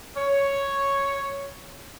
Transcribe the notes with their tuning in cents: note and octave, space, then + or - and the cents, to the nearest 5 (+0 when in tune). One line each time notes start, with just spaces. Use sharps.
C#5 +0